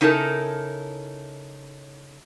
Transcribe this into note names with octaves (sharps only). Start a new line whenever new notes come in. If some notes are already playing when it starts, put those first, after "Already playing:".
C#3 D#4 E4 A4 A#4